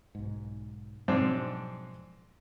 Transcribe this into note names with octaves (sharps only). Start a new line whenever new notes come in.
B1 G#2
G#2 B2 F3 F#3 C4 D4